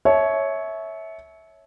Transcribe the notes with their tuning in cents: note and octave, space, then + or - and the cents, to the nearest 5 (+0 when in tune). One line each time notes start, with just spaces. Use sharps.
C#5 +0 E5 -20 A5 -40